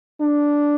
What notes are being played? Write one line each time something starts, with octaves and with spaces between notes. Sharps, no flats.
D4